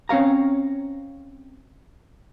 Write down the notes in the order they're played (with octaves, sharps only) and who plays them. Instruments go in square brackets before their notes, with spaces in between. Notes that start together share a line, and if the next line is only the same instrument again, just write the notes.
[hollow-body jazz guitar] C4 C#4 C#5 F5 A#5